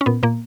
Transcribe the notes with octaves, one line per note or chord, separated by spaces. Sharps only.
C#4
A#2 B3
A#2 A#3